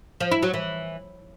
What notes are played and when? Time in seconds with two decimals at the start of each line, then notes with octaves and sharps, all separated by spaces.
0.20 F3
0.32 E4
0.43 F#3
0.54 E3